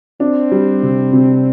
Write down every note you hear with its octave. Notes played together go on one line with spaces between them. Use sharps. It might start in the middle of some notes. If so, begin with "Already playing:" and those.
C4 D4
G3
C3
C3